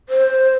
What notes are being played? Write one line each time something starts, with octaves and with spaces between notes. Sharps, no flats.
C5